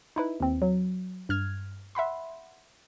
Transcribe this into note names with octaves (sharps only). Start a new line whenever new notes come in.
D#4 E4 B4
D#2 C4
F#3
G2 F6 G#6
E5 F#5 B5 C6